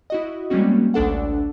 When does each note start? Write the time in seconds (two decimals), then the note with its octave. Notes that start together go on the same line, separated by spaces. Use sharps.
0.10 E4 F#4 D#5
0.50 G3 G#3 A#3 C4 C#4 F#4
0.94 A1 D2 D4 A4 F#5